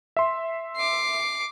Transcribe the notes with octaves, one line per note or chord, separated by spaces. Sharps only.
E5 C6
D6 C7